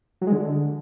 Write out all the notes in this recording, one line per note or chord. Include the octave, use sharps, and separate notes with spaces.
F#3
G#3
D3